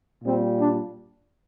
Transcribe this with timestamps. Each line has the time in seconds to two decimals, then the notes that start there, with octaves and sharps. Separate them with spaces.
0.24 A#2 G3 C4
0.58 D4